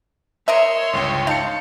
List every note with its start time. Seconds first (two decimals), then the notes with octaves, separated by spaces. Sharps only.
0.48 A#4 C#5 D#5 E5 C6
0.93 G1 C#2 G5
1.27 D#4 F5 A5 C#7